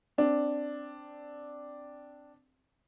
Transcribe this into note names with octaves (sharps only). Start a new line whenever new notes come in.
C4 D4